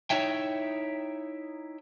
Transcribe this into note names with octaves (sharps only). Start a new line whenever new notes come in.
D#4 E4 C#5 E5 G5